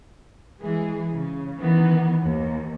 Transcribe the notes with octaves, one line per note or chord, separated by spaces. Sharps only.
E3 G#3 G#4
C#3
D#3 E3 B3
D#2